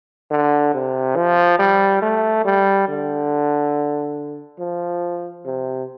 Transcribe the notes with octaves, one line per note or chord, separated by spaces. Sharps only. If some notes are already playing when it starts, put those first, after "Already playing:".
D3
C3
F3
G3
A3
G3
D3
F3
C3